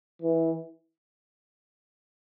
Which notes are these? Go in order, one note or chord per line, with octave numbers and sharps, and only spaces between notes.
E3